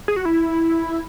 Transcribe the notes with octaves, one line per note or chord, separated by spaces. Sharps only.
G#4
F#4
E4